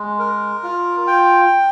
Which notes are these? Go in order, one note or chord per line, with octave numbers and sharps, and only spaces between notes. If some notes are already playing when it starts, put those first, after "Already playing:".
Already playing: G#3
A#4
F4
G5